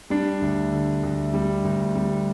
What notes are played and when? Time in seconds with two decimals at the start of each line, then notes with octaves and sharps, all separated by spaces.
0.10 G3 D4
0.42 D2
0.72 D3
1.03 D2
1.34 G3
1.65 D2
1.95 G3